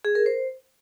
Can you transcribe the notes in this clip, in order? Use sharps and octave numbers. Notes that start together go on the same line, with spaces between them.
G#4
A#4
C5